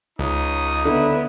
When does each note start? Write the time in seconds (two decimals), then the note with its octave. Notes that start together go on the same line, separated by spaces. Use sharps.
0.19 C#2 D#4 C#5 D#6
0.85 D3 B3 E4